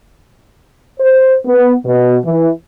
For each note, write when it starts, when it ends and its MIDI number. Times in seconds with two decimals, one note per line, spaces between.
1.00 1.34 72
1.45 1.74 59
1.84 2.17 47
2.24 2.49 52